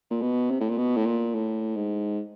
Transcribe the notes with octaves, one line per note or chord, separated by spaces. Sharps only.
A#2
B2
C3
A2
A#2
B2
A2
A#2
A2
G#2